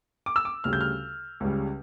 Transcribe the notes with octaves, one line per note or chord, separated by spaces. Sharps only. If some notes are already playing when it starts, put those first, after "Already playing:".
D6
E6
D6
D2 C#3 G3 F6
G6
F6
C#2 C#3 G3